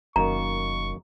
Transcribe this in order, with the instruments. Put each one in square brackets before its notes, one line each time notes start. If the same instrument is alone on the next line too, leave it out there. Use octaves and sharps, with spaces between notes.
[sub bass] F1 [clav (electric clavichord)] F#2 D#3 A#3 [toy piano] A#5 [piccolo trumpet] C#6